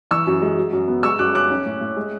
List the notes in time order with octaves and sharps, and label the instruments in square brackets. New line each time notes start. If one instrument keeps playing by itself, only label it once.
[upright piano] E3 C#6 E6
F#2
G#3
F#3
F#2
B3
G#3 C#6 E6
F#2 D6 F#6
C#4 D6 F#6
C#4
A2
A2
G#3